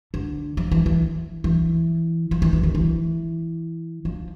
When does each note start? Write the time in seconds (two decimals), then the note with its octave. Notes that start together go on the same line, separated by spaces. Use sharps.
0.14 D3
0.57 F3
0.71 E3
0.86 E3
1.44 E3
2.31 F3
2.42 E3
2.53 E3
2.63 D#3
2.75 E3
4.05 F3